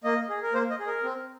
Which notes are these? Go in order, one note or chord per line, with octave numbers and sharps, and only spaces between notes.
A#3 D#5
G#4
A#4
A#3 C5
D#5
G#4
A#4
C4